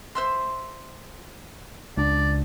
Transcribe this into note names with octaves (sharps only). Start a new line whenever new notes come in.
C5 E5 C6
C#2 D4 D5